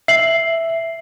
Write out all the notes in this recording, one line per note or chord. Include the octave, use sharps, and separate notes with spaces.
E5 C7 F#7